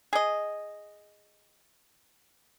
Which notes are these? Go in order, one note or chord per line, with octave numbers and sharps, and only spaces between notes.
G#4 D#5